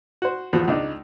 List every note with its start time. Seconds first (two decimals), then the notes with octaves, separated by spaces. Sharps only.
0.22 F#4 C5
0.53 E2 F3 F#4
0.68 C#2 D4 D#4